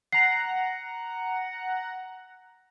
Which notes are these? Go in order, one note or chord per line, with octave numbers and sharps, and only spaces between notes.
F#5 A#5 C7